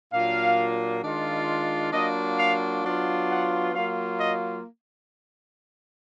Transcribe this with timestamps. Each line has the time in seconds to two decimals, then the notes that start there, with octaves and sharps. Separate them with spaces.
0.12 A#2 F#3 A#3 D4 F4 F5
1.02 D#3 G#3 D4 F4
1.92 F#3 A#3 D4 F4 D#5
2.39 F5
2.83 F#3 B3 D4 F4
3.28 F#5
3.73 F#3 A#3 F4 F5
4.18 D#5